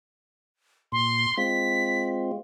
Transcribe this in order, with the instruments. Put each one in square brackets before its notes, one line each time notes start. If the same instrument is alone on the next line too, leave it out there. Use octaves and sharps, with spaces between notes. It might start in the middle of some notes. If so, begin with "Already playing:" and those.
[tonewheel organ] A#2 [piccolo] C6
[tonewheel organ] G#3 C4 F4 [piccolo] B6